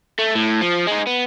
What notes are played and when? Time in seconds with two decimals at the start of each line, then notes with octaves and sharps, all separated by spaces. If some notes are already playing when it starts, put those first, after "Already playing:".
0.19 A3
0.35 A2
0.62 F3
0.87 G#3 D#4
1.07 B3